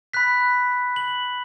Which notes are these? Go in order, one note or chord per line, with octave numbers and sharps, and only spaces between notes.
B5 F#6 B6
F#7